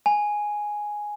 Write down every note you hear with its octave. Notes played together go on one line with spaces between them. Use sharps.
G#5